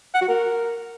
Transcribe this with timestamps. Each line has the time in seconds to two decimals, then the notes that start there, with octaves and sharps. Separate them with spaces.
0.14 F#5
0.21 F#4
0.29 A#4